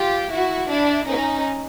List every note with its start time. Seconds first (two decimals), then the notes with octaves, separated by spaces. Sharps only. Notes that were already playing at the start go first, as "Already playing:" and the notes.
Already playing: F4 G4
0.32 E4 F#4
0.70 D4 E4
1.07 C#4 D#4